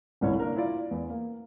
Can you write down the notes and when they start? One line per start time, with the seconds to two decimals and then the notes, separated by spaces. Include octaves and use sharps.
0.21 G1 C2 G3 E4 C#5
0.39 A#3 D4 A#4
0.56 E4 F4 D5
0.91 E2
1.10 A#3